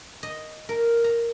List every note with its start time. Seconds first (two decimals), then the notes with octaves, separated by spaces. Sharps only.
0.23 D#5
0.69 A#4
1.04 A#5